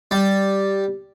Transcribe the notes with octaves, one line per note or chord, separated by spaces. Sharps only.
G3